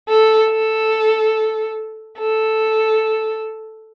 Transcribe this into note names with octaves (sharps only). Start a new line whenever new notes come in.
A4
A4
A4